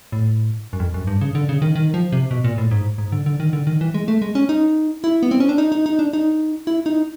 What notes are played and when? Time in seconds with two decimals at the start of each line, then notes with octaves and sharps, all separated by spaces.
0.12 A2
0.73 F#2
0.80 F2
0.94 F#2
1.07 G2
1.21 C#3
1.35 D3
1.49 C#3
1.62 D#3
1.75 D#3
1.94 F3
2.12 C3
2.31 B2
2.44 A#2
2.58 A2
2.71 G#2
2.98 G#2
3.12 D3
3.26 D3
3.40 D#3
3.53 D3
3.67 D#3
3.81 E3
3.94 G#3
4.08 A3
4.22 G#3
4.35 C#4
4.49 D#4
5.04 E4
5.23 B3
5.31 C4
5.40 C#4
5.49 D4
5.58 D#4
5.72 D#4
5.86 D#4
5.99 D4
6.13 D#4
6.67 E4
6.86 D#4